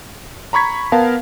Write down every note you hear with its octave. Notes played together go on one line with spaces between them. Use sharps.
A#5 B5 C#6 G#6 B6
B3 A#4 F5 A5